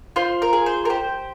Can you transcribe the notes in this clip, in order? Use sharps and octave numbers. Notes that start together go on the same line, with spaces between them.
F4 C5
A#4
G#4
C5
A#4
G4 C5